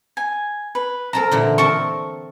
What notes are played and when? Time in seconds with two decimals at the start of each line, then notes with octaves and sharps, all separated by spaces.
0.17 G#5
0.75 B4
1.13 C4 A4 A#4 A#5
1.31 A#2 D3 E3
1.58 C4 A4 A#4 C#6